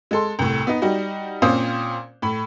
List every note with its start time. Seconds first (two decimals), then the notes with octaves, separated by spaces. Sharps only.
0.11 G#3 A4 C6
0.39 C2 A2
0.67 B3 D#4
0.82 G3 D#4 F#4
1.42 A#2 C4 C#4 C5 F5 D#6
2.22 A2 B5